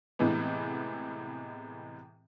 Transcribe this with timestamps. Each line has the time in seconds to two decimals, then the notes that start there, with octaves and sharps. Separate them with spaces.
0.19 A2 C3 E3 G#3 B3